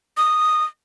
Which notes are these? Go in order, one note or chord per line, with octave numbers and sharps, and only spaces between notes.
D#6